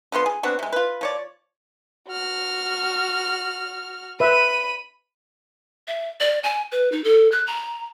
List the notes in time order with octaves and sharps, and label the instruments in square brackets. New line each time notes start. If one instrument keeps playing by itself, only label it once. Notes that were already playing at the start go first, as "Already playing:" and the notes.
[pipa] D3 F3 B3 C6
G#4
B3 C4 D4 F#4
C3 G#3
F4 B4
F3 C#5 D5
[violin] F#4 F6
[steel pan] B4 E5 [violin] B5 D#7
[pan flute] E5
D5
G#5
B4
D#4
A4
F#6
A#5